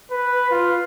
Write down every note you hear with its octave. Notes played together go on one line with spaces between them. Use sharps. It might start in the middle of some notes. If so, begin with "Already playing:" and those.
B4
F4